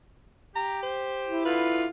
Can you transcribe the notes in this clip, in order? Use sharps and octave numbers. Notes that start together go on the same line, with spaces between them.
G4 A#5
C5
E4
D3 F4 B4